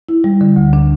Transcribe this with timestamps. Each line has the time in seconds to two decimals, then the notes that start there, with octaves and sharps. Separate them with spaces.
0.09 E4
0.24 G3
0.41 D3
0.56 D2
0.73 D4